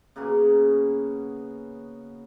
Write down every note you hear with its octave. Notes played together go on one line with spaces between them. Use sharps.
C#3 A#3 B3 F#4